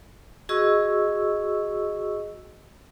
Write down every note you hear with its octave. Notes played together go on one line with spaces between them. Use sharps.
F#4 G#4 D#5 C#6 E6